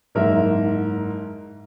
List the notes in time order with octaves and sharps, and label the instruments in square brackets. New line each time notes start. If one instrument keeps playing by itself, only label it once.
[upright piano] F#1 G#2 A#4 E5